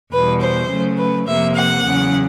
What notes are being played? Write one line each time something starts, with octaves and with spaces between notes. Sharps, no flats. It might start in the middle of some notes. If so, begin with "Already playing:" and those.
E2 B2 G3 B4
C5
C#3 F#3 A3
B4
F2 C3 F3 A#3 E5
F#5
E2 C#3 F#3